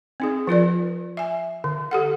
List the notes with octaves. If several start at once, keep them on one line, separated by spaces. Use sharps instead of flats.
C4 D#4 G#4
F3 F4 A#4 D5
E5 G#5
D3
G4 A4 F#5